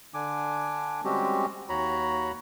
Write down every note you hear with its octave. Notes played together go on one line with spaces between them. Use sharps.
D3 D4 G#5 D6
G3 G#3 C4 C#4 F#4 G4
D#2 F#4 C#5 A#5 B5